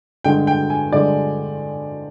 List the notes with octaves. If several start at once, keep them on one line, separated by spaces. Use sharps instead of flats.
G2 D3 G#3 G5
G5
G#5
G2 D3 G#3 D5